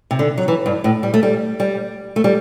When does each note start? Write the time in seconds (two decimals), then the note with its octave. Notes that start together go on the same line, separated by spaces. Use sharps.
0.11 C3
0.19 D3
0.38 F#3
0.48 E3
0.66 G2
0.84 A2
1.03 G3
1.14 A3
1.23 G3
1.60 G3
2.16 A3
2.24 G3